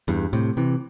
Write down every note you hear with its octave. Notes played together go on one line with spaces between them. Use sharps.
E2 G2
A2 C3
C3 E3